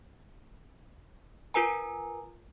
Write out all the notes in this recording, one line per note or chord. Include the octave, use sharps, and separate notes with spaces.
F4 A#4 B4 G#5 A#5